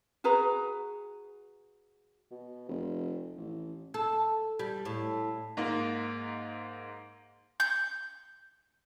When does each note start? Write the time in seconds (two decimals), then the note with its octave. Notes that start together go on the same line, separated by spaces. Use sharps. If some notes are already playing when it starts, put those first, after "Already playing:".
0.24 F#4 G#4 B4 A#5
2.31 B2
2.69 F1
3.37 A1
3.94 A4
4.59 G3
4.85 A2
5.57 G#2 A#3
7.60 G6